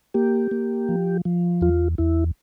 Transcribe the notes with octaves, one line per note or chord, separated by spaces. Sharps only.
A#3 G4
A#3
F3
F3
E2 F4
E2 E4